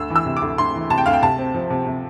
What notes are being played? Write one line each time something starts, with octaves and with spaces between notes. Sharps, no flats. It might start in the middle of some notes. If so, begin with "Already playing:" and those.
Already playing: D2 E6
E3
E6
C3
D6
D2
D2 C6
E3
C3 A5
G5
D2 F5
G5
C3 A5
C4
F3
C3
C3